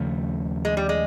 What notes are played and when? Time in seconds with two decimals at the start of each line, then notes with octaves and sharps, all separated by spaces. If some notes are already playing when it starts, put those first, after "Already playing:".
Already playing: D#2 C#3 F3 A3
0.65 G#3
0.77 G3
0.89 G#3